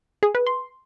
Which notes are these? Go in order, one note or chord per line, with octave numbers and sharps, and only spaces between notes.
G#4
B4
C6